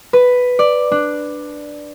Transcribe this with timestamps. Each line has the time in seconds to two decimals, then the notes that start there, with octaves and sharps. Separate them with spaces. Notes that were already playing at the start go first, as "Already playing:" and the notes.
0.13 B4
0.59 D5
0.92 D4